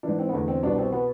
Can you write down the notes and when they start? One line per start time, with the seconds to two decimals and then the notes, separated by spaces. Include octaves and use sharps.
0.03 G#2 E3 D4
0.19 C4
0.29 B3
0.33 E2 D3 A3
0.48 C4
0.63 C2 B2 D4
0.78 C4
0.92 B2 B3